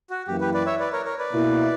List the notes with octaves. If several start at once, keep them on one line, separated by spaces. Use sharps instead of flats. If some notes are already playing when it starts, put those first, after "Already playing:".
F#4
F#2 E3 A#3 E4 G4
G4 B4
B4 D5
C#5 E5
B4 D5
A#4 C#5
A#4 C#5
B4 D5
B2 A#3 E4